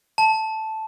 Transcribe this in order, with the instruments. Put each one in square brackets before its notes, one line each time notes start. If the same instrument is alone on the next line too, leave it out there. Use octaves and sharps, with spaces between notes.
[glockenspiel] A5